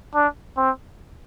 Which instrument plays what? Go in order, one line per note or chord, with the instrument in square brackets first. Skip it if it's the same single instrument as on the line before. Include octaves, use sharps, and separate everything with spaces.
[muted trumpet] D4
C4